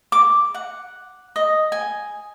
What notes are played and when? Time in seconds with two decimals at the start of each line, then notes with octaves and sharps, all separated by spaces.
0.12 D6
0.54 F#5
1.36 D#5
1.72 G#5